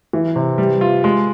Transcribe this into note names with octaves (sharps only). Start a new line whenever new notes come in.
E3
C3
G3
F4
G#3